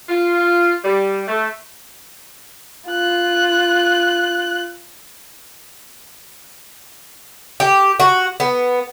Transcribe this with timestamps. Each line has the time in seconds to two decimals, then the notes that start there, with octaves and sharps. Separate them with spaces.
0.09 F4
0.84 G3
1.27 A3
2.89 F4 F#6
7.60 G4
8.00 F#4
8.40 B3